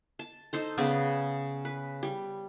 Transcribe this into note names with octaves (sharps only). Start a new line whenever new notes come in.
A5
D#4 A4 C5
C#3 B3 G#4 D5
B4
G3